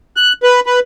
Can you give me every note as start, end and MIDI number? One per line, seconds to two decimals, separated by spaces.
0.17 0.33 90
0.43 0.60 71
0.66 0.80 71